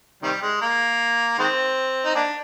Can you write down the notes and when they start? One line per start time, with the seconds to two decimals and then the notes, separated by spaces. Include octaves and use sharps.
0.23 C3 D#3 G3
0.42 G#3
0.61 A#3
1.39 D#3 G#3 C4
2.05 D#4
2.15 A#3 D4